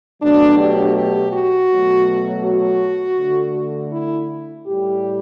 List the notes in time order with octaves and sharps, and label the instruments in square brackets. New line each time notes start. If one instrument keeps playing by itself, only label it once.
[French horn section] B2 F#3 A3 D4
G4
G4
F#4
B2 F#3 A3
F#4
D3 A3
E4
A2 G3 G4